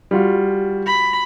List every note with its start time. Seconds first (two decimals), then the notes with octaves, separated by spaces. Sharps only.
0.11 G3 F4 F#4
0.87 B5